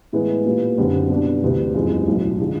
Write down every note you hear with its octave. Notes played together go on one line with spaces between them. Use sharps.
A2 E3 G#3 B3 E4
A#2 G3 B3
F#1 F#2 D3 G3 C4
B2 G3 B3 D4
D2 C3 E3 G3
F#1 E2 C3 F3 G#3
B1 A2 F#3
D3 F3 G#3